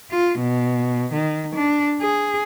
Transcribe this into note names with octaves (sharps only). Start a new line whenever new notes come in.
F4
B2
D#3
D4
G#4